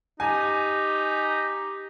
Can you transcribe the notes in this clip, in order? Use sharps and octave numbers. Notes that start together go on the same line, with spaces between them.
D#4 G4 G#5